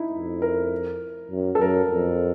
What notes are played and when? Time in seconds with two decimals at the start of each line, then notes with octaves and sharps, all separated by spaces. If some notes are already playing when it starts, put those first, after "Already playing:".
Already playing: D#4 E4
0.12 F2
0.42 A#4
1.31 F#2
1.55 A4
1.61 F#2 A#4
1.91 F2